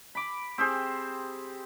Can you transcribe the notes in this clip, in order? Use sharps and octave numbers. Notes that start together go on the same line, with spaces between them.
B5 D6
C4 G4 G#4 C5